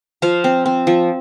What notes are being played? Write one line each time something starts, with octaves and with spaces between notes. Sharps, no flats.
F3 C5 F5
C4
C4
F3